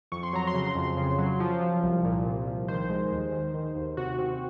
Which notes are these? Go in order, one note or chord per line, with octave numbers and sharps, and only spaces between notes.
F2 C#6
C6
F#3 A#5
C6
C#3
F2
C#3
F#3
F3
F3
C2
A#2
C2
F3
D#3 C5
G#3
D#2
D#3
D#3
D#2
C3 F#4
C4